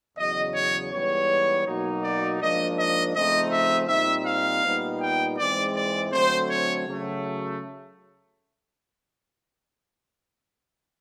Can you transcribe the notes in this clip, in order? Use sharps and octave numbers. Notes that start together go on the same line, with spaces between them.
E2 C#3 F#3 D#5
C#5
G#2 E3 G3 B3 C#5
B2 F#3 A#3 D#4
D5
G#2 F3 A#3 D4 D#5
D#5
C#3 F3 A3 C4 D#4 D#5
E5
A#2 G3 C4 D#4 E5
F5
A#2 G3 B3 D#4
G5
G#2 E3 G#3 C4 D5
D5
D3 F#3 A3 C4 C5
C#5
C#3 F#3 A3